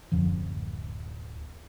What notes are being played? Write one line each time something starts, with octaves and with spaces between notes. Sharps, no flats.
D1 F#2 F3